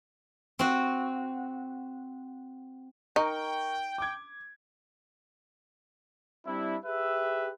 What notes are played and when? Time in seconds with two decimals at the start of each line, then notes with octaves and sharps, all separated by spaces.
0.59 C4 F#4
3.16 D#4 A#4 G5 C#6
3.98 D6 G#6
6.46 G3 C4 D4 E4
6.85 G4 G#4 B4 E5